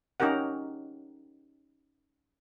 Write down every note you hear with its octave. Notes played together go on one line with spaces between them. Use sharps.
C#4 D#4 G4 A#4 F#5